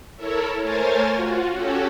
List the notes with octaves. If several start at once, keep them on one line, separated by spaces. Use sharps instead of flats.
E4 A4 A#4 C#5 E5
A3 A#4 C5 C#5 G#5 A6
F4 F#4
C#4 F#4 G4 A4 C#5